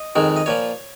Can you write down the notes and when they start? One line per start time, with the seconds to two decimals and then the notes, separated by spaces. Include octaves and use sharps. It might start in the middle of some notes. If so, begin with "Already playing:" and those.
Already playing: D#5
0.16 F2 D#3 G#3
0.36 D#5
0.46 A#2 F3 C#5